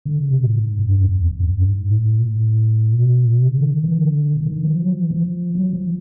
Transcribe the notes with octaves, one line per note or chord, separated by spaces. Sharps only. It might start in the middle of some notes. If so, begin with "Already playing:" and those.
D3
C#3
C3
A2
G#2
G#2
F#2
G2
F2
E2
F2
F#2
G2
G#2
A2
A#2
A2
A#2
B2
A#2
B2
C3
C#3
D#3
E3
D3
D3
D#3
F3
F#3
F3
E3
F3
F#3
F3